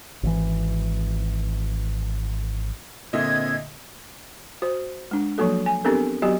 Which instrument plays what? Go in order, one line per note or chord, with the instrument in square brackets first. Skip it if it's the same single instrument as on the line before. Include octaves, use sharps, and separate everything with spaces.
[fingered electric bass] G#1 E3
[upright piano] A#2 D3 [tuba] C4 [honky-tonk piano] D#5 E5 [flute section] G#6
[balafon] F#4 C5
G#3 D4
F3 F#3 A#3 F#4 A4
G#5
B3 C4 D4 G4 A4 A#4
F#3 B3 F#4 G4 D#5